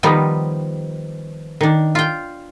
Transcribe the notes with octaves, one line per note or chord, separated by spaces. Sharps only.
D#3 F3 G3 B3 D#4
D#3 D4
F4 G5